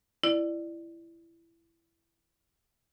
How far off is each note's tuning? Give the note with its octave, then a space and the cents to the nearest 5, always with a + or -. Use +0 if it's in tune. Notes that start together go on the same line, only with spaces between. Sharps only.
E4 +20 D5 +20